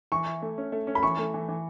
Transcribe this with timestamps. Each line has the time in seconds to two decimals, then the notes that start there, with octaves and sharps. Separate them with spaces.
0.12 E3 C#6
0.26 E4
0.42 A3
0.58 C#4
0.72 A3
0.87 C#4
0.95 B5
1.03 E3 C#6
1.18 A3
1.34 E3
1.48 E3